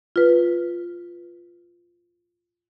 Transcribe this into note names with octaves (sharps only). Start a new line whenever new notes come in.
F4 B4